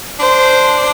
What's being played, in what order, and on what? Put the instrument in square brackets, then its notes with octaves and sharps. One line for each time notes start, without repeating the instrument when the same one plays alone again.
[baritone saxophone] D4 [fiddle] C5